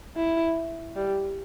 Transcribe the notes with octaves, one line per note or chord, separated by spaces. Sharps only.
E4
G3